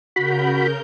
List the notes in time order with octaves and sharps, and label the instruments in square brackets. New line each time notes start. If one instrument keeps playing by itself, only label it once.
[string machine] C#3 A#4 G6 [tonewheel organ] F#4 B5